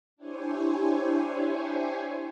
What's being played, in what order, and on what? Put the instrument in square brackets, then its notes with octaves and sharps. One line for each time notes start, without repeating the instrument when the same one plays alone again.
[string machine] D4 E4 G4 C5 C#5 G#5